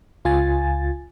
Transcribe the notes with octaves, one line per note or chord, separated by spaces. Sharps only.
C#2 F4 G#5 A6